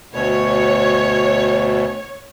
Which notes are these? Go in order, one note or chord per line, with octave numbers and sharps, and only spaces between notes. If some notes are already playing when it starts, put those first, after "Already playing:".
D2 B2 C#5